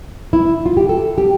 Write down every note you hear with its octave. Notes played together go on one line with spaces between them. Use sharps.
E4
F4
G4
A4
G4